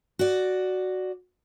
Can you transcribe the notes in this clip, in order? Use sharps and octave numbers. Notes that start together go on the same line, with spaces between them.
F#4 D5